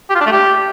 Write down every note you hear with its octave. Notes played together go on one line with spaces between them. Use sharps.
G4
F4
D4
A3
G4